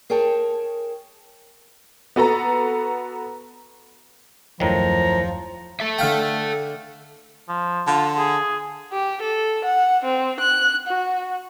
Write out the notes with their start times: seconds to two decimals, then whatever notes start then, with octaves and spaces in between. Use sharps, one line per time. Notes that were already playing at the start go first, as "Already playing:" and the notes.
0.10 G#4 A#4 C#5 G5 A5
2.16 B3 F#4 A4 A#5
4.60 D#1 F#2 A2 D#3 F3 A#5
5.80 A4 E5
5.99 D3 F5 G5
7.48 F3
7.87 D3 F4
8.18 G#4
8.92 G4
9.22 A4
9.65 F#5
10.05 C4
10.40 F#6
10.87 F#4